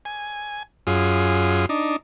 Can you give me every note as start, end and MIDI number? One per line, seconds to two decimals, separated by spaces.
0.05 0.63 80
0.87 1.66 42
0.87 1.66 65
0.87 1.66 68
1.69 1.96 62
1.69 1.96 63